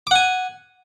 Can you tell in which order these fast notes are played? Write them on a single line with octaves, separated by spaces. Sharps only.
D6 F#5 G#5